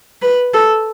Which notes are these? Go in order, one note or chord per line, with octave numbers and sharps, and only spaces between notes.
B4
A4